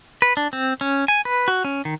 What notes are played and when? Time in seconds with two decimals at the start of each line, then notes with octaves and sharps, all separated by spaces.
0.22 B4
0.37 D4
0.53 C4
0.81 C#4
1.08 G#5
1.25 B4
1.48 F#4
1.65 C#4
1.85 D#3